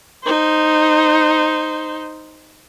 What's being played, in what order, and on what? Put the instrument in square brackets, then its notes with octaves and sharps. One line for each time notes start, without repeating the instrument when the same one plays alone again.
[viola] D#4 C5